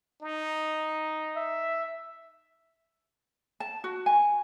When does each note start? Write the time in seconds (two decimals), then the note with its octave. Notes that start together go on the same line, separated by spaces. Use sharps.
0.22 D#4
1.36 E5
3.60 A5
3.84 F#4
4.06 G#5